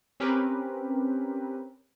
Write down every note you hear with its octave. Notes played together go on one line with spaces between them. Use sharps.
C4 C#4 G4 A#4 B4